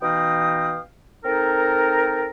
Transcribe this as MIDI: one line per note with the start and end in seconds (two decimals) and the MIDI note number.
0.02 0.79 47
0.02 0.79 52
0.02 0.79 63
0.02 0.79 77
0.02 0.79 79
0.02 0.79 87
1.24 2.30 60
1.24 2.30 63
1.24 2.30 69
1.24 2.30 70